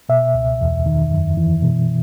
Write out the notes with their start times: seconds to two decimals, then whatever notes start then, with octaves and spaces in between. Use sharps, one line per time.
0.09 B2 E5
0.34 C#2
0.61 E2
0.86 D#3
1.12 F#2
1.37 E3
1.63 B2